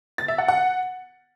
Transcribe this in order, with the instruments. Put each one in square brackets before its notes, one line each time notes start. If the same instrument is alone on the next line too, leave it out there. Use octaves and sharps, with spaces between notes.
[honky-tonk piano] A6
E5
F#5
F#5